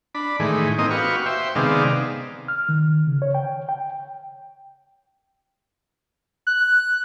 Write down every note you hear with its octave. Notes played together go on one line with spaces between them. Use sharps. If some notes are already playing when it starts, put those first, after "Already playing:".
D4 B5
A2 D#3 E3 G#3
A#3 C4 D#4 D#5
F#4 G4 B4 F5 C#6
C5 E5 G5
C3 D#3 G#3 B3 D5 F5
F6
D#3
C#3
C#5
G5
G5
F#6